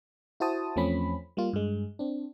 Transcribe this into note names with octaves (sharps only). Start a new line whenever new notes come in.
E4 F#4 C5 A5 D#6
E2 F3 A3 C4 C#4 B5
G3 A#3 F4
G2 G#3
C4 D4